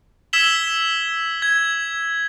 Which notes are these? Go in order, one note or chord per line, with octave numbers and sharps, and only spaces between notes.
E6 G#6 B6 E7 F#7 G7
G#6